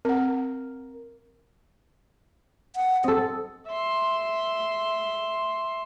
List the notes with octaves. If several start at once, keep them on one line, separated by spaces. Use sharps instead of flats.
C4 A#4 F#5
F#5
C4 A4 D#5
E5 C6